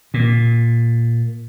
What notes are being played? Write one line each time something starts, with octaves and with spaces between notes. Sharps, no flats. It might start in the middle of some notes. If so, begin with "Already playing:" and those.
A#2